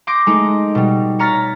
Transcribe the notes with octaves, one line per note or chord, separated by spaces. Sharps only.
C6 D6 G6 A#6 D7
G#3 A3 D#4
B2 G3
C#5 A#5 F6 A6 B6